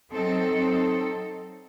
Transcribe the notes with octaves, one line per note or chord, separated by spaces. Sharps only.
F#3 C4 D#4 A4